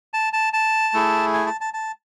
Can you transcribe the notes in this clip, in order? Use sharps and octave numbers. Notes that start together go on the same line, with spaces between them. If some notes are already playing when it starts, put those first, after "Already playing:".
A5
A5
A5
A3 E4 G#4
G#5
A5
A5
A5